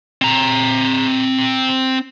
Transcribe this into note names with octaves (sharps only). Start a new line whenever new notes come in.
C4 A#5